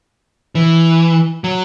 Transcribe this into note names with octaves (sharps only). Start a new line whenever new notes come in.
E3
F#3